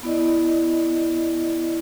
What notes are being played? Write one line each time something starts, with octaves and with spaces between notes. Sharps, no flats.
B3 E4 D5 D#5